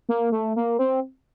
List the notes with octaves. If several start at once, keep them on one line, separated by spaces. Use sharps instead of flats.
A#3
A3
A#3
C4